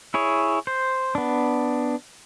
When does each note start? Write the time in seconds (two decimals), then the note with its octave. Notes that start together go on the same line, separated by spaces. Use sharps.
0.14 E4 G#4 C#5
0.67 C5
1.15 B3 D4